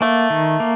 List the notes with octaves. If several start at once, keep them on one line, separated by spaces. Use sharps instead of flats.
A3 A#3
D#3
A#3